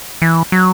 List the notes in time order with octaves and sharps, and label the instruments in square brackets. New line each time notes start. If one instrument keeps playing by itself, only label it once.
[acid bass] E3
F#3